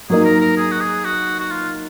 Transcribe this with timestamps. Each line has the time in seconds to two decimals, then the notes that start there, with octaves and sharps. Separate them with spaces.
0.10 F#3 A#3 D#4 G#4
0.25 A#4
0.41 A#4
0.57 G#4
0.71 F#4
0.80 G#4
1.04 F#4
1.39 F#4
1.51 F4